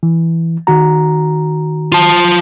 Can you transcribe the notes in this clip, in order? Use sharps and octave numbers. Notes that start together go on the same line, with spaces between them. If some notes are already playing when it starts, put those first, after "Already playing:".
E3
D#3 F#4 A#5
F4 A5